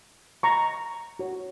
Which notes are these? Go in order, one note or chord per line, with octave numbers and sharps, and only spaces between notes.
A#5 C#6
F#4 C#5